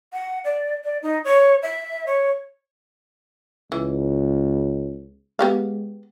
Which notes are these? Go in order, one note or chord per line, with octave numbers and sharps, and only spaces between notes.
F#5
D5
D5
D#4
C#5
E5
C#5
C#2 E3
G#3 B3 G4 F5